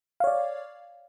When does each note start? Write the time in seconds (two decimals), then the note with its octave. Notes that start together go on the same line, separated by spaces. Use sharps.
0.20 F5
0.24 C#5
0.27 D5